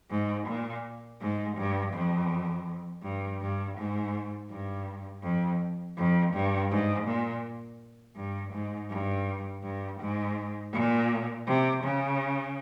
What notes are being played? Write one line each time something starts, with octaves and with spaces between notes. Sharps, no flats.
G#2
A#2
G#2
G2
F2
G2
G2
G#2
G2
F2
F2
G2
G#2
A#2
G2
G#2
G2
G2
G#2
A#2
C3
C#3